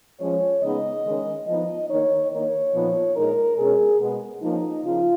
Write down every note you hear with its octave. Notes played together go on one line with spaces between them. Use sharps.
F3 G#3 C#4 C#5
C#3 G#3 B3 D#4 D#5
D#3 G#3 C#4
F3 B3 D#4 D#5
D#3 A#3 D#4 C#5
D#3 A#3 D#4 C#5
A#2 F3 B3 D#4
A#2 G#3 D#4 A#4
B2 G#3 C#4 G#4
B2 G#3 B3
F3 A#3 C#4 D#4
C#3 F3 F4